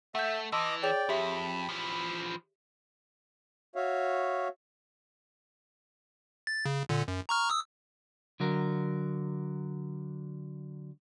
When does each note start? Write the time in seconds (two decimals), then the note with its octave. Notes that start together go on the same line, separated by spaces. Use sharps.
0.15 A3 E5 F#5 G6
0.52 E3 D#5 A5 C6 D6 E6
0.83 G#4 C#5 D5 G5 F7
1.09 F2 G4 E5 B5 F#7
1.69 E3 F3
3.76 F#4 C#5 E5 F5
6.47 A6
6.65 C#3
6.89 A#2 D3
7.08 F#2
7.29 A#5 C#6 F6
7.50 D#6 E6
8.40 D3 F#3 A#4